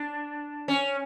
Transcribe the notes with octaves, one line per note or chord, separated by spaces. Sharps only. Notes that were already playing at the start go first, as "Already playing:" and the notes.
Already playing: D4
C#4